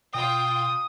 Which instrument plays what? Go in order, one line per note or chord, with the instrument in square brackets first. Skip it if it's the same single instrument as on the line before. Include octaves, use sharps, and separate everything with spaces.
[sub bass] B2 [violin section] F4 G5 [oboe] D#6